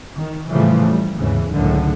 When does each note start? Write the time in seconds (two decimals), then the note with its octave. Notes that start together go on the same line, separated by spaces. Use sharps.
0.17 D#3
0.49 A2 C#3 E3 F3 G3 A3
0.87 G3
1.18 G#1 D#2 G#2 C#3 E3
1.50 F#1 C#2 A2 D3 D#3